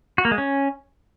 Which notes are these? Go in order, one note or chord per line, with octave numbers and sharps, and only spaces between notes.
F#4
A#3
G#3
C#4